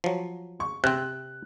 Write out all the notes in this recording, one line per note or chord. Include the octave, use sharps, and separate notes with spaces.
F3 F#3
C#6
C3 C4 F#6